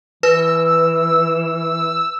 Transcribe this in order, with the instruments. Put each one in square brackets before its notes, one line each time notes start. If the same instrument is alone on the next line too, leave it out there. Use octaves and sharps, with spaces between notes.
[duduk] E3 [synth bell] B4 [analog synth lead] E6